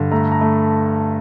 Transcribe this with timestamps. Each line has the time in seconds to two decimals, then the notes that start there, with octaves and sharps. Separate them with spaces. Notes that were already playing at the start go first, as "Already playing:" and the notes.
Already playing: G2 D3
0.12 A3 A#5
0.32 A#5
0.41 A3